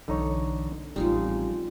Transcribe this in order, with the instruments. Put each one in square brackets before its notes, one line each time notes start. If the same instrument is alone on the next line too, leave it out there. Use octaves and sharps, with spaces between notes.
[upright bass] B1 E3 [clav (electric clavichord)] D3 D#4 C#5
[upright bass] A1 C4 [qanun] F3 G#3 D#4 [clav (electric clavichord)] G3